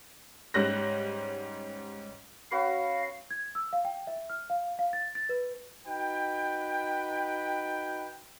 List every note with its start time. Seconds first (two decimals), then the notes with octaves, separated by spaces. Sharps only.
0.54 G#2 G3 C#4 F#6 A#6
2.51 C#4 F#4 B4 F5
3.31 G#6
3.55 E6
3.73 F5
3.85 G5
4.07 E5
4.30 F6
4.50 F5
4.79 F5
4.93 A6
5.15 A6
5.29 B4
5.87 D#4 F#4 B4 G5